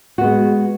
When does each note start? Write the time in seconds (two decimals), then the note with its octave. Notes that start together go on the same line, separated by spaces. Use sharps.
0.18 F#4
0.21 B3
0.24 G#3